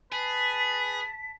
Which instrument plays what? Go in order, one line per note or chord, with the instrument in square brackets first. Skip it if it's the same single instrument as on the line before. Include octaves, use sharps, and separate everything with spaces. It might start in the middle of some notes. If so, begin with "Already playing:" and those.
[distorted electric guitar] G#4 [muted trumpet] B4 [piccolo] A5 [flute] B6